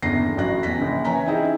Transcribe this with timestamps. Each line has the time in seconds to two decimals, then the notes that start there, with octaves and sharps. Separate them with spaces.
0.02 G1 E2 C#3 A#6 C7
0.37 A1 F#3 F#6 A#6
0.63 E2 A#6 B6
0.77 A#1 C#3
1.04 E3 C#5 G#5 A#5 B6
1.26 C4 C#4 D#4 E4 G#4